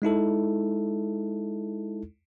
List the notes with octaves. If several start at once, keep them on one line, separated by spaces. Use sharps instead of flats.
G#3 D#4 E4 A4